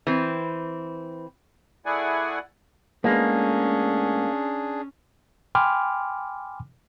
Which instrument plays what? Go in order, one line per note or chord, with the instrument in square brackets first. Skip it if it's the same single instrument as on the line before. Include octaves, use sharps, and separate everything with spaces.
[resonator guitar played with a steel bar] E3 C4
[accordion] A3 E4 G#4 D5 F#5 G#5
[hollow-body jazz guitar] A2 G#3 B3 [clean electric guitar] A#3 [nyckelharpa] C#4 [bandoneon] D4 G#4
[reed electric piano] G5 G#5 B5 C6 D6 F6